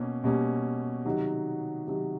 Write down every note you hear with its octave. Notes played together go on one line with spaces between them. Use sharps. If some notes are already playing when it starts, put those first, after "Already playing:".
Already playing: B2 A#3 C#4
B2 G3 A#3 C#4
C3 D#3 F#3
C3 D#3 F#3